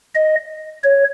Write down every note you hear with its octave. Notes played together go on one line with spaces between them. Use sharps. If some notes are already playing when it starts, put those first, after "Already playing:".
D#5
C#5